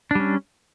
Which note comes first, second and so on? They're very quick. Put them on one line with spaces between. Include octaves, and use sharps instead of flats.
D4 G3 C#4